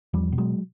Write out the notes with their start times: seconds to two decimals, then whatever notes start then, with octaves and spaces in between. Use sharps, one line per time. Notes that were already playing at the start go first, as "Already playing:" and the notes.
0.13 E2 F3 G3
0.32 B2
0.38 F#3 G#3